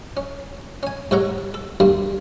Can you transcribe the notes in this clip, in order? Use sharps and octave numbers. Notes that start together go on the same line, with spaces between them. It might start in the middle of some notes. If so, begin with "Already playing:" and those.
C#4
C#4 G#5
G#2 G3 A4 C#5 F#5 A#5
A4
D2 G2 G3 A#3